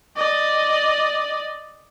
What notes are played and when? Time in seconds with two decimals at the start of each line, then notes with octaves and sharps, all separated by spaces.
0.16 D5 D#5